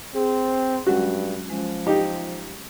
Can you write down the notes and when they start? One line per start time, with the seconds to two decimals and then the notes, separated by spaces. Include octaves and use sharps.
0.14 C4 G#4
0.87 G2 F#3 G#3 C#4 F#4
1.50 F3 G#3 C#4
1.87 D#4 G4